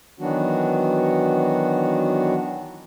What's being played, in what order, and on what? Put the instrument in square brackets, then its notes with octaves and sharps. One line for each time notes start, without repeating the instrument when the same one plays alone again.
[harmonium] D#3 E3 F#3 B3 D4 F#4